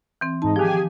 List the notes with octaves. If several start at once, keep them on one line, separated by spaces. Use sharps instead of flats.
E3 C4
G#2 D#4 A5
D#3 F3 G4 G#4 G#5